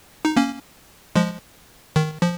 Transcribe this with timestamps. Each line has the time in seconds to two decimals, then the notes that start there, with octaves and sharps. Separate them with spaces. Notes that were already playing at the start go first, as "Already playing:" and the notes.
0.25 D#4
0.36 A#3 C#4
1.16 F3 G#3
1.96 D#3
2.22 F3